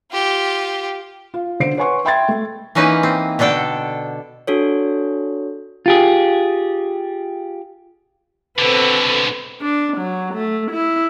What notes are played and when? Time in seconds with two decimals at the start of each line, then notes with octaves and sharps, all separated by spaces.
0.11 F4 G4
1.34 F4
1.60 D3 C5 C7 D7
1.77 B4 C#5 F#5 G#5 C6 C#6
2.05 E5 G5 B5 C6 G#6 A6
2.28 A3
2.75 E3 A#3 C#4 D#4 B4
3.03 C4
3.39 B2 D3 D4 A4 G5
4.47 D4 F#4 A4 C#5
5.86 F4 G4 G#4
8.59 B2 D3 C4 A4 B4
9.61 D4
9.97 F#3
10.34 A3
10.71 E4